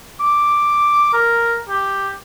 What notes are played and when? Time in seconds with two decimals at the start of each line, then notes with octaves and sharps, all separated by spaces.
0.20 D6
1.13 A#4
1.69 G4